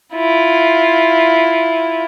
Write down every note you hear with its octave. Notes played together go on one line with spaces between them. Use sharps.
E4 F4